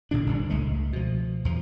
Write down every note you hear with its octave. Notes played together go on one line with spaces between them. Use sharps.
A1 A#2 D3 D4
G1 C3
C#2 G#3 A3
B2 F3
E2 F3